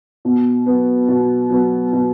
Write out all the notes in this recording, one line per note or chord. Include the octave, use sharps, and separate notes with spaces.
B2
F#3 B3
B2
F#3 B3
B2